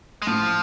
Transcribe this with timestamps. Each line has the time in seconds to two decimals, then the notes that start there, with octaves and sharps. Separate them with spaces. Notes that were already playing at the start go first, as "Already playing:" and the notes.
0.22 G#3
0.27 A2 F3